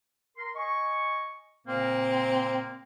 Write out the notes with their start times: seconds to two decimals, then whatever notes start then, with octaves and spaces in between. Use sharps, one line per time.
0.37 A#4 C6
0.55 D#5 G#5 C#6
1.67 A#2 C#3 A#3 C4